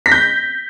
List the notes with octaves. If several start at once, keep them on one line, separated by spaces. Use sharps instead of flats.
G6 A#6 B6